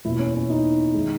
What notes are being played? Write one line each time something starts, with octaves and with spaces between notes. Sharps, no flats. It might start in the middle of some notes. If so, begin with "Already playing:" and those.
E2 B2 A#3 E4
C#4
C#4
D#4
D#3 G#3